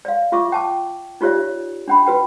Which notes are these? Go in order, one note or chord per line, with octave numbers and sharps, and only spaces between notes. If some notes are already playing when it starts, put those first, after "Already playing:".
D5 F5
F4 E5 C#6 D6
G5 A5 D6
D#4 F4 G4 C#5 D5 E5
D4 G5 B5
F#4 B4 G5